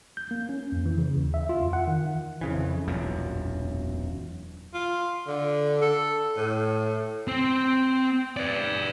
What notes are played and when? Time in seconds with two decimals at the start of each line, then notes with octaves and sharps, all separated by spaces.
0.17 G6
0.31 A#3
0.49 C#4
0.72 F2
0.86 E3
0.98 C#3
1.17 D#2
1.34 E5
1.49 F4
1.61 F2
1.73 F#5
1.87 D#3
2.41 F2 C#3 E3
2.88 E1 B1 F#2 A#2
4.73 F4
5.27 D3
5.82 A4
6.36 A2
7.28 C4
8.37 B4 D5